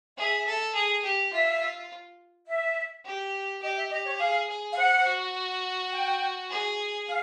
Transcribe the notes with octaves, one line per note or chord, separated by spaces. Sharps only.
G#4 E5
A4
G#4
G4
F4 E5
E5
G4
G4 D#5
E5
G4 D#5
C#5
G#4 F5
G#4
F5
C5 F#5
F#4
G5
G#4
F5